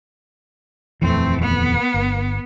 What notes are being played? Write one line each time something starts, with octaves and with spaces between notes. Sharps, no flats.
D#1 F2 E3 A3 C4
B3
G1